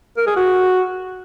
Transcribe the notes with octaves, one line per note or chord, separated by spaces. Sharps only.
A#4
G#4
F#4